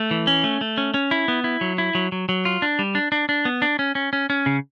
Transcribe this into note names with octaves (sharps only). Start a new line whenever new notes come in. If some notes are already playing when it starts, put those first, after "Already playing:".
Already playing: A3
E3
C#4
A3
A3
C#4
C#4
E4
B3
E4
F#3
E4
F#3
F#3
F#3
F4
D4
G3
D4
D4
D4
B3
D4
C#4
C#4
C#4
C#4
C#3